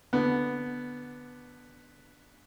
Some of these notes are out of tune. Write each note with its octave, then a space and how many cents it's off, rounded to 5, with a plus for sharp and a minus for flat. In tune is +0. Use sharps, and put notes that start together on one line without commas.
D3 +0 B3 +0